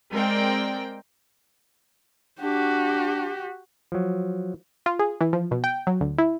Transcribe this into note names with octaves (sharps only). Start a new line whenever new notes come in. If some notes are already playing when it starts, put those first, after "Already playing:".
G#3 C4 A#4 D5 G5
D4 F#4 G4
F3 F#3
F4
G#4
E3
F3
B2
G5
F#3
D2
E4